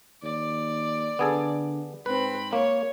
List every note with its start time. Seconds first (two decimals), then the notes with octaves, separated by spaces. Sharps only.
0.23 D#2 D5
1.19 D3 B3 G#4 A4
2.06 G#2 C4 B4 B5
2.53 A#3 C#5